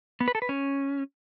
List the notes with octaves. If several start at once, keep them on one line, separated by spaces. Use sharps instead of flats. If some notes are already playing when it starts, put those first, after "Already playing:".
B3
B4
A4
B4
C#4